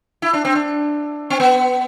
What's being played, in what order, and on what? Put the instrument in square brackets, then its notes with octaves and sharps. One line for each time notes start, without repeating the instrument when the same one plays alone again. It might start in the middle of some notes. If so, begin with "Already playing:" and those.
[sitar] E4
D4
C4
D4
C4
B3